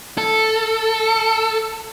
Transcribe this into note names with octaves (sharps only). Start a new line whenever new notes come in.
A4